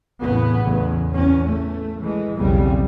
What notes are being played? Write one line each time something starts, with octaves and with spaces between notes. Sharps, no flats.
E2 A2 C#3 B3
A1 E2 C#3
E2 C#4
A3
E3 G#3
B1 E2 C#3 G3 C4